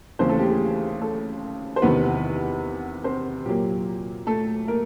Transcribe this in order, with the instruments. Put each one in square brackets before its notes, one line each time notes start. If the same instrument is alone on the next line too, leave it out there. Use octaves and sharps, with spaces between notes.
[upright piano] D#2 C#3 E3 C4 C5
A3 A4
G4
G#4
A3 A4
C5
E2 C3 D#3 B3 B4
C4 C5
A#2 F#3 A#3 G4
A3 A4
A#3 A#4